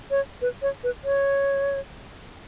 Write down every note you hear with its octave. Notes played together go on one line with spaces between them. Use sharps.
C#5
B4
C#5
B4
C#5